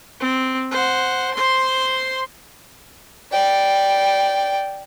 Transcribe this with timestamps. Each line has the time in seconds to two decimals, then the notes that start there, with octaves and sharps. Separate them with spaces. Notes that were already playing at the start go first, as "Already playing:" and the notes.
0.20 C4
0.72 C5 F#5
1.35 C5 C6
3.32 D5 G5